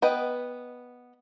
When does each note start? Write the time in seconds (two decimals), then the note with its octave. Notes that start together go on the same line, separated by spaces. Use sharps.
0.02 B3 B4 D#5 G5